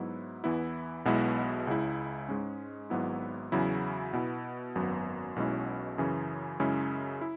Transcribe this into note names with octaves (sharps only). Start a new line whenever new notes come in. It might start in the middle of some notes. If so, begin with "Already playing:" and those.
Already playing: G#2 F#3 B3 E4
E2 E3 B3 E4
B1 B2 G#3 B3 E4
C#2 C#3 G#3 E4
G#2 G#3 C#4
G#1 G#2 F#3 B3 E4
E2 C#3 F#3 E4
B2 B3 E4
G#1 F#2 F#3 B3
B1 B2 G#3 C#4 E4
F#2 C#3 E3 C#4
F#2 C#3 G#3 C#4 E4
E4